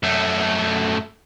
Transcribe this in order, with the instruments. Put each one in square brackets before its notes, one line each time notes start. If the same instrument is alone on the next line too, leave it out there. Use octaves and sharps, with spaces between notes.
[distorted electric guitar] F#2 A3